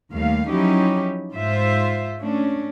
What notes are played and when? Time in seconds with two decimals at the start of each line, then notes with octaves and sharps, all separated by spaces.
0.11 D#2 D#3 G3 A3 F5
0.48 F3 F#3 C#4 D#4 E4 G4
1.32 G#2 F4 C5 E5
2.20 A3 C#4 D4